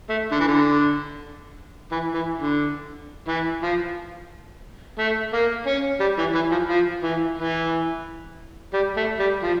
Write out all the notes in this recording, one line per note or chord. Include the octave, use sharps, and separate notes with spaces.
A3
D3
E3
D3
E3
E3
D3
E3
F3
A3
A#3
C#4
G3
E3
E3
F3
F3
E3
E3
G3
A3
G3
F3